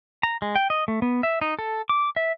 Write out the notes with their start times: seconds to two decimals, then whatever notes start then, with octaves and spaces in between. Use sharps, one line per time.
0.23 A#5
0.42 G#3
0.56 G5
0.70 D#5
0.88 A3
1.02 B3
1.23 E5
1.42 D#4
1.59 A4
1.89 D6
2.16 E5